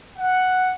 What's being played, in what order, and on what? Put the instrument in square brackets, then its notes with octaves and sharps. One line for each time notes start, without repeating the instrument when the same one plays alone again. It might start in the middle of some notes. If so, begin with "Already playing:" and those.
[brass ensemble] F#5